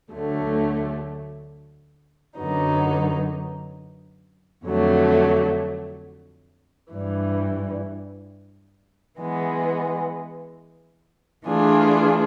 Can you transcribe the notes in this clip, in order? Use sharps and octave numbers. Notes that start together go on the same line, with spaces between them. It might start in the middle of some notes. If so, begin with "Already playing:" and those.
D2 D3 F#3 A3
F#2 D3 F#3 B3 D#4
F2 D3 F#3 A3
G2 E3 G3
E3 G#3 B3
E3 A3 D4 F4 G#4